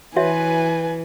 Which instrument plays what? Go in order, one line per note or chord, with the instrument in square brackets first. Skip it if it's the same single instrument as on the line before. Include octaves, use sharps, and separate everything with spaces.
[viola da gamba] E3 [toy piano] F#4 C#5 E5 [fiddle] B4 [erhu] G#5